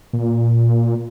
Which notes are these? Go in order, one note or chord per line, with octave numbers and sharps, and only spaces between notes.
A#2